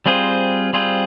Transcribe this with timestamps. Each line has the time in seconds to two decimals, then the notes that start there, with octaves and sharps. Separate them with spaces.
0.06 G3 C4 F4 G#4 C5
0.73 G3 C4 F4 G#4 C5